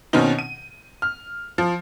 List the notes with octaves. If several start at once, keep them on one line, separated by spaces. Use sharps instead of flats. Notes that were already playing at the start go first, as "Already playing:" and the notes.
B2 D#3 C4 C#4 D#4
D#7
F6
F3